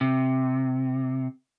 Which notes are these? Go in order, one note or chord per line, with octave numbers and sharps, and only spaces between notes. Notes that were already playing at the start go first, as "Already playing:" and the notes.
C3